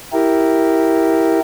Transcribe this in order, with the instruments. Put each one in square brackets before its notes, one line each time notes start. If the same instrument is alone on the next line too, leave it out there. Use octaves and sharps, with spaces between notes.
[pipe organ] E4 G4 A#4